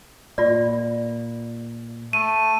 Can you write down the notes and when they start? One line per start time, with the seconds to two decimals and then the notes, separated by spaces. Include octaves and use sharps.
0.38 A#2 F4 D5
2.13 A3 D#7